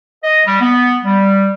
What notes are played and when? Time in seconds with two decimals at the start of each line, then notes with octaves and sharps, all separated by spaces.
0.23 D#5
0.46 G3
0.61 B3
1.05 G3